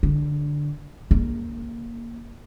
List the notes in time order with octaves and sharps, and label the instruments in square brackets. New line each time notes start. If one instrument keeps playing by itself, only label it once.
[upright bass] D3
C#3 A#3